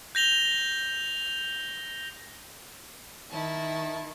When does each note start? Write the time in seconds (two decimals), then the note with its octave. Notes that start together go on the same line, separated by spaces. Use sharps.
0.15 G6 A#6 F7 G7
3.30 D#3 E4 A5